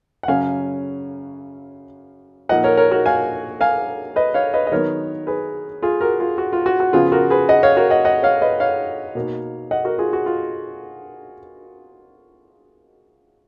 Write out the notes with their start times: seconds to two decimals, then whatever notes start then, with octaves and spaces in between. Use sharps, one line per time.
0.23 F#5
0.28 F#2 C#3 F#3 C#4 F5 G#5
2.49 A#2 F3 A#3 D#4 D#5 F#5
2.64 A#4 C#5
2.77 A#4 C#5
2.91 F#4 A#4
3.06 F5 G#5
3.61 F5 G#5
4.16 B4 D#5
4.34 C#5 F5
4.54 B4 D#5
4.67 D#5
4.72 D#3 F#3 B3 D#4 A#4 C#5
5.27 G#4 B4
5.83 F4 G#4
6.01 F#4 A#4
6.19 F4 G#4
6.38 F#4
6.53 F4
6.66 F#4
6.80 F#4
6.93 C#3 F3 B3 F4 G#4
7.12 F#4 A#4
7.30 G#4 B4
7.49 D#5 F#5
7.63 C#5 F5
7.77 F#4 A#4
7.90 D#5 F#5
8.05 D#5 F#5
8.23 C#5 F5
8.42 B4 D#5
8.60 C#5 F5
9.15 B2 A#3 D#4
9.71 D#5 F#5
9.85 F#4 A#4
9.98 F4 G#4
10.13 F#4
10.26 F4